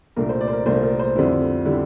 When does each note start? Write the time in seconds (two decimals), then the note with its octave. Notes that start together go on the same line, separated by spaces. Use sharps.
0.16 C2 A#2 A3 D4 A#4
0.29 C5
0.41 D5
0.48 C5
0.53 A#4
0.65 C2 A#2 A3 D4 C5
0.83 A#4
0.99 C5
1.15 F2 D3 G3 C4 E4
1.65 D3 G3 C4 E4